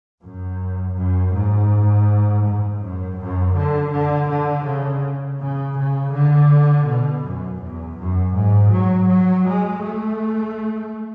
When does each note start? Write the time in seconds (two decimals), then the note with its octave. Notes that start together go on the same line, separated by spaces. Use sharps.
0.23 F#2
0.97 F#2
1.34 G#2
2.44 G#2
2.81 F#2
3.19 F#2
3.56 D3
3.92 D3
4.29 D3
4.66 C#3
5.40 C#3
5.77 C#3
6.13 D3
6.87 B2
7.25 F#2
7.61 E2
7.99 F#2
8.36 G#2
8.72 F#3
9.09 F#3
9.47 G#3
9.83 A3